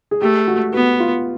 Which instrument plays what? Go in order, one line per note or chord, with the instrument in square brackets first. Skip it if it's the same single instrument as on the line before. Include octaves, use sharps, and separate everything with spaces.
[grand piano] G#4
[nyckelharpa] A3 [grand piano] G4
[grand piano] F#4
[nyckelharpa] B3 [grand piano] F#4
[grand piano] F4